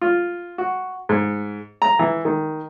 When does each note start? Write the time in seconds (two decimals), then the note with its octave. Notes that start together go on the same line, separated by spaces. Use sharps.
0.01 F4
0.58 F#4
1.09 G#2
1.82 A#5
1.99 E3
2.25 D#3